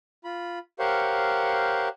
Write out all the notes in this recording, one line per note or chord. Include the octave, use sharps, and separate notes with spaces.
F4 B5
G4 A#4 C5 C#5 F5 F#5